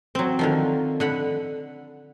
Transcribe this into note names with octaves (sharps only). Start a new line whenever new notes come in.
F#3 C4
D3 D#3 F3
D3 F#5 B5